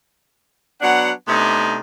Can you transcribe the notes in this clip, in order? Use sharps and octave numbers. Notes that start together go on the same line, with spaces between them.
F#3 B3 D4 F#5
C3 A3 B3 D4 D#4